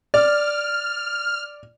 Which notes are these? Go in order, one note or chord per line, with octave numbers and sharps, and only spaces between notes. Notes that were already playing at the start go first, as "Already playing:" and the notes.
D5 F6